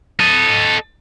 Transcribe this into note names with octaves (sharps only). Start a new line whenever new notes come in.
A4 D#5